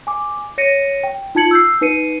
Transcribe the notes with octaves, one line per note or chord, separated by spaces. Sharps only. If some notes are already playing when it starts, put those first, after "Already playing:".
G#5 D6
C#5 A#6 C#7 D#7
G5
D#4 F4 A5 G#6 C#7 F#7
E6 G6 C7
D#4 B4 C7 C#7 D#7